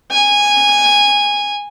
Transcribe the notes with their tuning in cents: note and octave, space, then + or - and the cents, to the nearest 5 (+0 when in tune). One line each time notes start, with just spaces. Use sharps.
G#5 -10